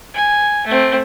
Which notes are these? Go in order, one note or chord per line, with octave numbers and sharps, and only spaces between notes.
G#5
A3 C4